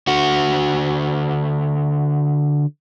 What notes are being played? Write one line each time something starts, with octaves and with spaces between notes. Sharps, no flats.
D3 F#4